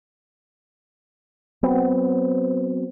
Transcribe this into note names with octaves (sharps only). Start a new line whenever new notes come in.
F#3 B3 C4